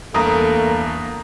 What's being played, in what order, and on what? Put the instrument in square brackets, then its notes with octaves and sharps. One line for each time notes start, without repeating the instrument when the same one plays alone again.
[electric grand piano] E2 G2 [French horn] A3 [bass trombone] A#3 [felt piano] A#5 D#6